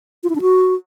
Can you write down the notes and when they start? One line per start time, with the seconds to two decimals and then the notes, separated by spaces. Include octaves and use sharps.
0.24 F4
0.30 E4
0.35 D4
0.41 F#4